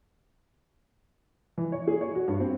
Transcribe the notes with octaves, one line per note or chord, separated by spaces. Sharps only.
E3
C#5
G#4
C#5
F#4
G2
C4